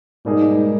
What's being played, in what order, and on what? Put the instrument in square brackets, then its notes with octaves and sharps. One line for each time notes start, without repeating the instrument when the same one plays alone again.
[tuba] G#2 [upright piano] B2 G3 A#3 D#4 G#4